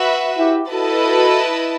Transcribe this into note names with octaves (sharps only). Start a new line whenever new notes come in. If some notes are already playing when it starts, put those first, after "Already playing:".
Already playing: F#4 B4 E5
E4 G4
E4 F#4 A4 B4 D#5 A5